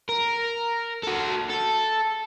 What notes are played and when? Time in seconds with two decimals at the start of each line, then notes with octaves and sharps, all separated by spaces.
0.09 A#4
1.03 F#4 A4
1.50 A4